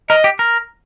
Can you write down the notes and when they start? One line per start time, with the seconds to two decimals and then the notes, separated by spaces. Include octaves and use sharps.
0.10 A#4 D#5
0.24 G4
0.39 A#4